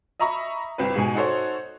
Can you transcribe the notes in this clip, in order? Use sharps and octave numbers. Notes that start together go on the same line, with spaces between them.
D#5 E5 A#5 B5 C#6
G1 C2 C4 B4
G#2 B2 G#5
D#4 F#4 A4 C5 C#5